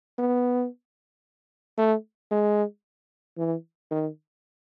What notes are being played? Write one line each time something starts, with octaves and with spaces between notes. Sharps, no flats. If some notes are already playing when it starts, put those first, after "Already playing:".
B3
A3
G#3
E3
D#3